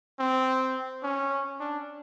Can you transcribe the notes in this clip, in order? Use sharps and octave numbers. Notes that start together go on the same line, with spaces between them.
C4
C#4
D4